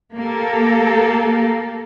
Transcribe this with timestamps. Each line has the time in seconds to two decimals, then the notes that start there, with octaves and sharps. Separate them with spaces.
0.17 A#3 G4 A4